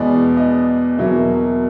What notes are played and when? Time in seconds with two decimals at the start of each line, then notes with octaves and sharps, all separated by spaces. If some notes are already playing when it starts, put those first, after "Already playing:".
Already playing: E2 B2 G#3 B3 D5
0.37 D#5
0.98 E2 B2 F#3 A#3 E5